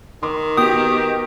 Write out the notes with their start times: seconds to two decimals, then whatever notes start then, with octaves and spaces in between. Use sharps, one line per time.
0.23 D#3 A#4 C6 D6
0.57 B3 F#4 G4 D6 D#6